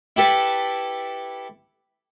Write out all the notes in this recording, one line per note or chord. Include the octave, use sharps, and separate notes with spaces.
E4 G4 A4 B4